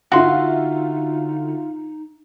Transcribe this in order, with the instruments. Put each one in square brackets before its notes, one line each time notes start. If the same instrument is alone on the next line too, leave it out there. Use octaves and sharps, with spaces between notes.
[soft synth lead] D3 [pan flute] D#4 [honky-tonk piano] F4 E5 F5 [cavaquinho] F#4 C6